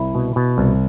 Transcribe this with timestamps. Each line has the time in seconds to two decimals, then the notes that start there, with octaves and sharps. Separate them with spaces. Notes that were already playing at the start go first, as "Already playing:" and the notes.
Already playing: C2 E4
0.15 B2
0.36 B2
0.58 C2